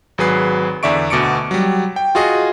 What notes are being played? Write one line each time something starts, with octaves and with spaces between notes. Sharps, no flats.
G#1 F#3 G#4 B4 C7
E2 D3 D5 E5 C#6 D7
D2 B2 D6 C#7 D7
F#3 G3
G5
F4 F#4 G#4 D#5